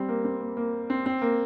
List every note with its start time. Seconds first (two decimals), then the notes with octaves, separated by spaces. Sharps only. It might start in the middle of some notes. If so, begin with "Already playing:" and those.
Already playing: G3 C4
0.09 A#3
0.25 C4
0.41 A#3
0.57 A#3
0.90 C4
1.06 C4
1.22 A#3